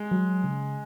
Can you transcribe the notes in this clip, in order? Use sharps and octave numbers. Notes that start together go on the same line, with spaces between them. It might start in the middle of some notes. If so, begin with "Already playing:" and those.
Already playing: G#3
F#3
C#3